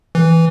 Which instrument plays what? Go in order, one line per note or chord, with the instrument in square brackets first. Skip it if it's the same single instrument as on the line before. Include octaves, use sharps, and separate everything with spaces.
[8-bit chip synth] E3